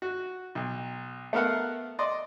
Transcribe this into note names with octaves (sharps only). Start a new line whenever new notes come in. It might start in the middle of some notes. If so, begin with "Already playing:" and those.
F#4
B1
A3 B3 A#4 F5 F#5
D5 D#5 C6